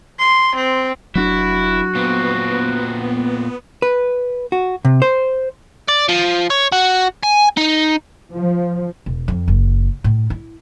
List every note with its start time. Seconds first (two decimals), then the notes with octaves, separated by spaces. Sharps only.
0.20 C6
0.55 C4
1.15 F1 F#3 C#4 D4 E4 F#4
1.95 A#2 B3 C4
3.82 B4
4.52 F#4
4.85 C3
5.02 C5
5.89 D5
6.09 F3
6.50 C#5
6.72 F#4
7.23 G#5
7.57 D#4
8.34 F3
9.06 E1
9.28 F2
9.48 F#1
10.04 A2
10.30 E4